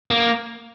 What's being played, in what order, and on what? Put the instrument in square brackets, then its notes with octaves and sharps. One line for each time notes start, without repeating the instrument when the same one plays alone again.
[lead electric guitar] A#3